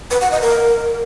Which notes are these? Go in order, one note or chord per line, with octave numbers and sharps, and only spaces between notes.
B4
F#5
D#5
A#4